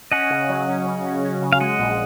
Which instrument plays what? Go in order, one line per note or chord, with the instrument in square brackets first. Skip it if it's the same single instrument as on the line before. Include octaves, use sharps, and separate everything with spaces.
[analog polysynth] C#4 [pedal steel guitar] D#5 F#5
[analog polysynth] C#3
F#3
C#4
C#3
C#4
C#4
C#3
[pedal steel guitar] F5
[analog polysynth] G#3 [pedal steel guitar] D#5 F#5
[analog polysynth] A#1